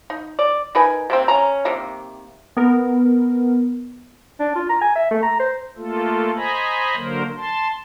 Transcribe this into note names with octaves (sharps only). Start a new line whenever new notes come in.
D#4
D5
D#4 A#4 B4 G#5
C3 A#3 C4
C#4 A#5
C3 D#3 A#3
B3 A#4
D4
F4
A#5
G#5
E5
A3
A#5
C5
A3 A#3 F4 A4
C5 D#5 G#5 A#5 B5
D3 F#3 A#3 A#4 C5
A5 C6